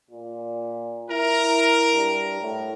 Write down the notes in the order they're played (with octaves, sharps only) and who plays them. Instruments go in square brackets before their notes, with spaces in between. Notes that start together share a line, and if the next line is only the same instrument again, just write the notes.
[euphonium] A#2
[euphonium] E4 [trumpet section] A#4
[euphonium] G2
A2